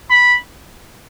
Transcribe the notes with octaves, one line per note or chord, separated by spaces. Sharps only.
B5